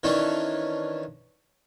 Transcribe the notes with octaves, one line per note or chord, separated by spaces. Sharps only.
D#3 E3 C#4 D4